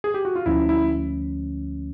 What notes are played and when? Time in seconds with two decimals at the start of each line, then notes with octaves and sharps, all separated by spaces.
0.04 G#4
0.14 G4
0.25 F#4
0.35 F4
0.46 D2 D3 F3 A3 C#4 E4
0.69 E4